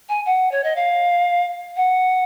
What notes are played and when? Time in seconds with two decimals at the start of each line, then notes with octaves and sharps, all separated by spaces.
0.09 G#5
0.26 F#5
0.51 C#5
0.64 D#5
0.76 F5
1.76 F#5